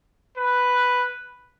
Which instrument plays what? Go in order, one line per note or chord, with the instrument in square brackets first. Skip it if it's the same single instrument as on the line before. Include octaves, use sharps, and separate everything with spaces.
[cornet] B4